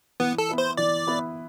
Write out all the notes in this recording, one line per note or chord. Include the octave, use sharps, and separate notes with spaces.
E3 B3
A4
B3 E4 B4
C5
E3 D5
B3 E4 B4